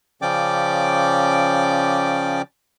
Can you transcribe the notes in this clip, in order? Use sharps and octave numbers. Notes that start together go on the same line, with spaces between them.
C#3 F3 C#4 D5 G5 D6